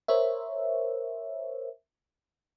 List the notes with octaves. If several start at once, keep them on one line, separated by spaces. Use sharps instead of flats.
A#4 C5 C#5 E5